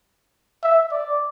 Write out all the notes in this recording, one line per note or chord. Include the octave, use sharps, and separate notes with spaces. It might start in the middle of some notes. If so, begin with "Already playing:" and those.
E5
D5